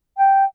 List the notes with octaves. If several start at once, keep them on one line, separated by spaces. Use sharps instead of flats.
G5